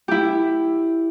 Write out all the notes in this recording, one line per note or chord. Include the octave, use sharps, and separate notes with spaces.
E4 G4